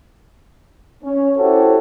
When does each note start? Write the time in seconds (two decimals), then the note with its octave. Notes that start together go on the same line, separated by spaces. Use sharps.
1.04 C#4
1.37 E4 F#4 G4 A4 C5 C#5